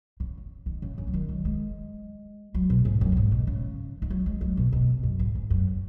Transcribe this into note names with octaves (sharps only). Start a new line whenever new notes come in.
C#3
D#3
C#3
C#3
F#3
D#3
F#3
G#3
F#3
B2
G#2
F#2
B2
G#2
B2
C#3
D#3
F#3
G#3
F#3
B2
B2
F#2
G#2
G#2
F#2